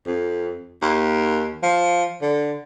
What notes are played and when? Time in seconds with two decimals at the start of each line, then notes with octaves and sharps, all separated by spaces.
0.06 F2
0.82 D#2
1.63 F3
2.22 D3